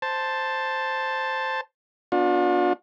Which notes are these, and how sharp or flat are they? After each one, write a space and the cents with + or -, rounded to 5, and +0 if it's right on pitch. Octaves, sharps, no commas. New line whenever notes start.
C5 +0 A5 +0
B3 +0 D4 +0 F4 +45